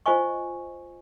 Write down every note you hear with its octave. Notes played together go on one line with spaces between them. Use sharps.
F4 C5 D#5 G#5 C#6